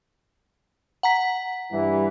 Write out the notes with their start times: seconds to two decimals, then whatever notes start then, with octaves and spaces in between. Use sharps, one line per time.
1.03 F#5 A#5 B6
1.72 G2 E3